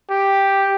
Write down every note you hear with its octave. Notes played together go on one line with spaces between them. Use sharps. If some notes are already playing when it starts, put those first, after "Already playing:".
G4